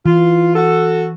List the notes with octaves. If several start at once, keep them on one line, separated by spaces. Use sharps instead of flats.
E3 F4
F#4 A4